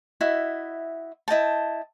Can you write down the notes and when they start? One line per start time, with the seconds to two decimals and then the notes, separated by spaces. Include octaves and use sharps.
0.21 E4 F#4 D#5 E5
1.28 E4 D#5 G5 A5